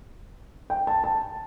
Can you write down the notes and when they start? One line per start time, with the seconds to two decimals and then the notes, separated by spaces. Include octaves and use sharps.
0.70 G5
0.87 A5
1.04 A5